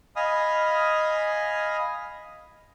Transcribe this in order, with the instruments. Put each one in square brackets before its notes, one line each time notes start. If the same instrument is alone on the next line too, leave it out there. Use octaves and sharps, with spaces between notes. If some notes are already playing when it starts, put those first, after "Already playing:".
[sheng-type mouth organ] D#5 F5 G#5 B5 D#6 F6